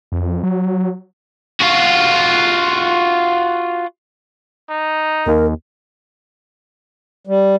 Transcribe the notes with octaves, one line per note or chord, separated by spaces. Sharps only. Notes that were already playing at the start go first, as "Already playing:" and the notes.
F2
F#3
F4 F#4
D#4
D#2 A#4
G3